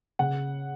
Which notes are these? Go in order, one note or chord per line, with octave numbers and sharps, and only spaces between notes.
C#3 F#5